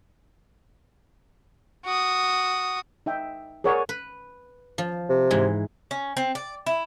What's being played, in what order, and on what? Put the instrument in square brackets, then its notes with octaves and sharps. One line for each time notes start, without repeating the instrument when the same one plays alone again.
[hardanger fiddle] F#4 D#6
[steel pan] D#4 E5 G5
G#4 A#4 C#5 D5 F#5 G#5
[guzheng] B4
F3
[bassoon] C3
[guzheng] G#2 E3 G#3
[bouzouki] C#4
C4
D5
E4